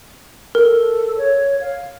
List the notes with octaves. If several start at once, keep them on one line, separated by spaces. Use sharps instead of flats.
A4 A#4
C#5
F5